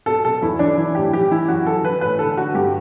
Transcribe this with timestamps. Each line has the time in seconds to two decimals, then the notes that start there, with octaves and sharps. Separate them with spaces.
0.06 B2 A4
0.25 B2 A4
0.42 E2 E4
0.59 E3 D4
0.78 E3 E4
0.95 A2 G4
1.13 E3 G4
1.31 E3 E4
1.48 F#2 F#4
1.66 E3 A4
1.84 E3 B4
2.01 A2 B4
2.19 D3 A4
2.37 D3 F#4
2.54 G2 G4